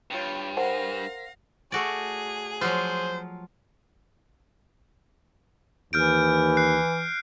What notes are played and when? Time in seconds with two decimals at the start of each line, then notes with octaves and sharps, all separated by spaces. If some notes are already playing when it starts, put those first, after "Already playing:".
0.10 G2 F4 C#5 G5
0.57 A#4 C5 F5 F#5 A#6
1.72 A3 F#4 G#4 D5
2.61 F3 F#3 F4 C5
5.93 D#2 E3 F6 G6 D7
6.57 F#6 C7